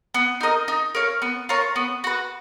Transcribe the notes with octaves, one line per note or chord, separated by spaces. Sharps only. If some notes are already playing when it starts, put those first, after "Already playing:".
B3
D#4 A#4 D#5
D#4
A#4 C#5 F5
B3
F4 A#4 C#5
B3
F#4 B4